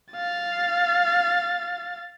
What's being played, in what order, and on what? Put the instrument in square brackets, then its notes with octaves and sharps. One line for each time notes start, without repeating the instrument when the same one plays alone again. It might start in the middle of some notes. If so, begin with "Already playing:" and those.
[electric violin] F5 A6